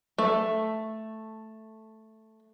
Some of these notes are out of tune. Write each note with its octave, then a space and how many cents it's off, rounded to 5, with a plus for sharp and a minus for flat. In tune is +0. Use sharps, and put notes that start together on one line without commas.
A3 +0